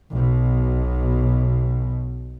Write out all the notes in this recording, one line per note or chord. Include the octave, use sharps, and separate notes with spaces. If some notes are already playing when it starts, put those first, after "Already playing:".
B1 B2